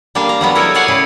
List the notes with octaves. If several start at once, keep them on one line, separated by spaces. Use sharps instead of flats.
G3 A#3 D4 F5
A#5
F#3 G3 B3
E4 A4 A#4 C#5 D#5
G#4 A#4 C#5 D5 F#5 G#5
A2 C#3 E4